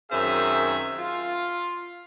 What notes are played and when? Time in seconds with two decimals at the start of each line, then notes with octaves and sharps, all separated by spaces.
0.12 F#2 D#3 C4 G#4 E5
0.97 F4